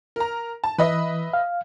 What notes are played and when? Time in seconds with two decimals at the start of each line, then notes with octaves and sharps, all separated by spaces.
0.16 A#4 A#5
0.64 A5
0.78 E3 B4 D#5 E5
1.33 F5